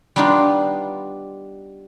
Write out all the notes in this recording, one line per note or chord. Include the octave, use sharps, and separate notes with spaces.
G3 B3 D4 D#4 F4